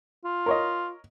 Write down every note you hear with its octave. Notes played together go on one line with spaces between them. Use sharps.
F4
A#4 C#5 D#5